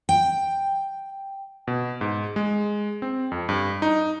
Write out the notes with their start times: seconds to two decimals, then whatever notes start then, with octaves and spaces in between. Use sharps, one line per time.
0.09 G5
1.67 B2
2.01 G#2
2.36 G#3
3.02 C4
3.32 F2
3.49 G2
3.82 D#4